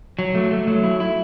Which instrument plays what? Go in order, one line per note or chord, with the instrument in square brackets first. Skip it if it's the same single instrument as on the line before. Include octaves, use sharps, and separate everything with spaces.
[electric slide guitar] F#3
A3
A3
F#3
E4
E4